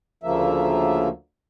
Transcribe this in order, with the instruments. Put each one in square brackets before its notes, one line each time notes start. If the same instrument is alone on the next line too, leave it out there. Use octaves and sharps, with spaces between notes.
[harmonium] D2 C#3 F3 A#3 E5